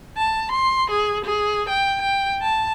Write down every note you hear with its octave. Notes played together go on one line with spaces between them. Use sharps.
A5
C6
G#4
G#4
G5
G5
A5